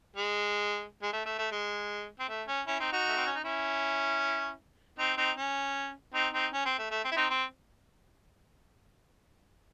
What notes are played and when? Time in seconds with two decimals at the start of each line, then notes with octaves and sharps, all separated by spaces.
0.16 G#3
1.02 G#3
1.13 A3
1.25 A3
1.39 A3
1.52 G#3
2.20 C4
2.29 A3
2.48 C#4
2.67 C#4 E4
2.80 C4 D#4
2.92 D#4 F#4
3.08 A3
3.17 C4
3.26 C#4
3.35 D#4
3.44 C#4 E4
4.98 C4 D#4
5.17 C4 D#4
5.37 C#4
6.14 C4 D#4
6.33 C4 D#4
6.53 C#4
6.66 C4
6.78 A3
6.91 A3
7.04 C4
7.12 E4
7.17 C4 D#4
7.30 C4